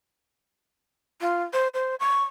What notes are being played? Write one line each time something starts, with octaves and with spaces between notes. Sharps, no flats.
F4
C5
C5
C#6